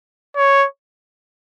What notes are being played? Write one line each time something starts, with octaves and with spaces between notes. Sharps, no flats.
C#5